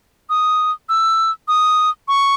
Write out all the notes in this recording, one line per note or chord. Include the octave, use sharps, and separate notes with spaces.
D#6
E6
D#6
C#6